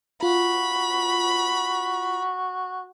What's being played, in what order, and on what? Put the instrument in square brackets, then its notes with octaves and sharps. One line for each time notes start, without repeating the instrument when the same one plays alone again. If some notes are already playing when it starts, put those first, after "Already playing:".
[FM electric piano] F4 [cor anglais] F#4 [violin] B5